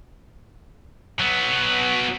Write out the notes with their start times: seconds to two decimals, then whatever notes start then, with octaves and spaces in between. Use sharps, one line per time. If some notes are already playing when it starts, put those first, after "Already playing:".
1.20 F#3 B3